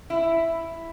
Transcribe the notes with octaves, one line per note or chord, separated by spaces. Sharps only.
E4